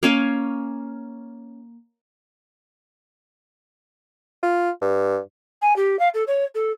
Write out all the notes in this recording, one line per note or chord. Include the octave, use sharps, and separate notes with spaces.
A#3 C#4 F5 G#5
F4
G2
G#5
G4
F5
A4
C#5
A4